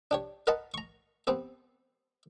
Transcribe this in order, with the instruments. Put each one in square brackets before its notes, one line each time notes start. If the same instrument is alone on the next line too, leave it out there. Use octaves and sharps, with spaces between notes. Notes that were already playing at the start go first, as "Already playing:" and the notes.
[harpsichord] D4 G4 C#5
A#4 B4 D#5 F#5 A5 B5
A#5 C#6
B3 C4 G4